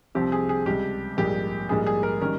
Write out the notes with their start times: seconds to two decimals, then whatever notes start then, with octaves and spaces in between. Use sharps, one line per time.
0.15 C2 C3 F3 C4 G4
0.32 G#4
0.49 G#4
0.66 C#2 C3 G3 G4
1.17 A#1 G#2 G3 A#3 G4
1.69 A#1 G#2 G3 A#3 G#4
1.86 G#4
2.03 A#4
2.21 D#3 G3 C#4 A#4